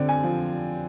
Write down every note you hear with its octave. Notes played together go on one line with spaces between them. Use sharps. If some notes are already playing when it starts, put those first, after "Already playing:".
Already playing: D3 C4
G#5
F3